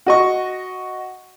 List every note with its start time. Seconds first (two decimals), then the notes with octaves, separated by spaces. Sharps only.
0.06 F#4 D#5 C#6